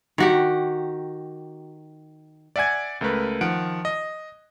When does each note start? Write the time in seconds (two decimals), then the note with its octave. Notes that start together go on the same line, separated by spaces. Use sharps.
0.18 D#3 F#4 G4
2.56 D5 E5 F#5 G#5 G#6
3.01 C#2 A3 A#4 B4
3.41 D#3 F3 F#5 D7
3.85 D#5